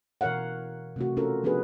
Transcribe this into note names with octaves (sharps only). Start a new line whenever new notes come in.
B2 E3 A#4 C#5 F5 F#5
C3 A3 F#4
C#4 F4 A4 A#4
F3 B3 D4 F#4 G#4 B4